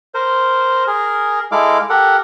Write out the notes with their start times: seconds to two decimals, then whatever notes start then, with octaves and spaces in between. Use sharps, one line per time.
0.14 A#4 C5
0.87 G#4 A#4
1.52 G#3 E4 A4 F5 D6
1.90 G4 A4 A#4 F#5